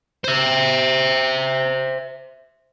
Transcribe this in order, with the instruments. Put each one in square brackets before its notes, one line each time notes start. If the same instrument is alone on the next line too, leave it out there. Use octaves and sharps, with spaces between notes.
[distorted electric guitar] C5 E5